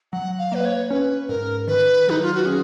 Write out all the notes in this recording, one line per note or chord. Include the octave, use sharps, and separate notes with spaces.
F#3 F#5
F5
A#3 B4
C#5
C#4 B4
G#2 A#4
D#3 B4
F#3 D#4
F4
F#4
C#4 G#4